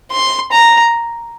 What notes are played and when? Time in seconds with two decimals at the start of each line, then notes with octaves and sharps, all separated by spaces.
0.12 C6
0.52 A#5